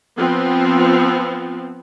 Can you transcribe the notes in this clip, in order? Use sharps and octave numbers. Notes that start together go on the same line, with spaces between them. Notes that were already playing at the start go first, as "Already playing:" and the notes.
F3 B3 C4